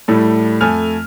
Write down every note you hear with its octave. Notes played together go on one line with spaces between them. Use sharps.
A2 G3 A3
F2 A3 G#5 F6 F7